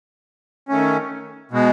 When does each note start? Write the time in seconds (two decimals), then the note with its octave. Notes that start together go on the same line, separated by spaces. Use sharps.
0.69 D#3 A3 C#4
1.51 B2 G#3